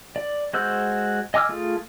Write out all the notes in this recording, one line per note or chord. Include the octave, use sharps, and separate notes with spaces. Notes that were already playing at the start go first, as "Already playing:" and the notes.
D5
G#3 F#4 C5 E6 G6
D#5 G#5 D6 E6 F6
A3 F4 G#4